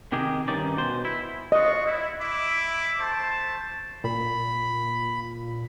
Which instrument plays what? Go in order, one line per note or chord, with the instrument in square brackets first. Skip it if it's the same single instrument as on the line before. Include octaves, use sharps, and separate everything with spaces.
[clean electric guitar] C3 D#3 G4 G#4
G2 D#3 C#4 D#4 D5
B2 C5
E4
[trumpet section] F4 F#4 C#6 [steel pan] D#5
[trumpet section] E4
E4 E5 D6
A3 C5 A5
[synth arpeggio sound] A#2 [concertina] B5